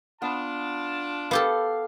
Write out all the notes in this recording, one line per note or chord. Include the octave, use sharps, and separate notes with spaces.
B3 D4 F4 A5
B3 G4 A4 F5